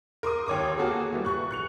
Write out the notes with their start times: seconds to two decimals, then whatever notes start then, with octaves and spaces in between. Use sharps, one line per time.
0.23 A#4 C6 D6 D#6
0.46 D#2 C#5 D6 D#6
0.78 A#3 F#4 G#4 A4
1.12 E3 G3
1.25 C#6 F#6
1.51 F#6 C#7 F7